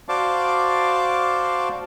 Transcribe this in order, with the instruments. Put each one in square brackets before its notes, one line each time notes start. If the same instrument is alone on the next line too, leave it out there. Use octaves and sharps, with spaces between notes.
[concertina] F#4 C5 D5 F5 A5 D6